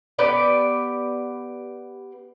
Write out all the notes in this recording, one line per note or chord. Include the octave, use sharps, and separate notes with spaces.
B3 G4 B4 D5